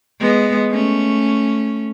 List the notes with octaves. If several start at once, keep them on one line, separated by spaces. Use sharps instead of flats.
G#3 B3
A3 C#4